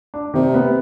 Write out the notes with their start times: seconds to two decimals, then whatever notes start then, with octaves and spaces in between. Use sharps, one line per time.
0.14 D4
0.34 C3 D#3
0.54 B3